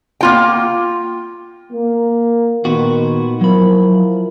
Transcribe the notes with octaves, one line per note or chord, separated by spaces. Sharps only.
A#3 F4 G5
A#3
A#2 D#3 B3 F#4
F3 F#3 E4 A#4 B5